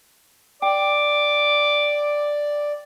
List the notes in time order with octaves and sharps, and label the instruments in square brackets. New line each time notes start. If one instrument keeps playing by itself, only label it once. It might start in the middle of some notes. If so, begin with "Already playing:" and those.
[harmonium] D5 [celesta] G5 [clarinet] D6